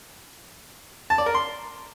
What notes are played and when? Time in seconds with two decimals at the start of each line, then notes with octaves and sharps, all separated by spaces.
1.10 A5
1.18 D5
1.26 A#4
1.34 C6